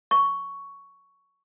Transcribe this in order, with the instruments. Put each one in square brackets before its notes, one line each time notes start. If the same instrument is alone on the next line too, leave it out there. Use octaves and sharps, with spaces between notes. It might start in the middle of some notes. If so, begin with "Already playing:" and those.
[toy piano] C#6